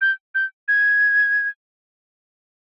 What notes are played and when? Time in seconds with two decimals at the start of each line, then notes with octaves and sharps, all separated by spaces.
0.01 G6
0.35 G6
0.68 G#6